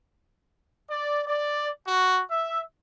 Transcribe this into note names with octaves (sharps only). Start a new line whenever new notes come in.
D5
D5
F#4
E5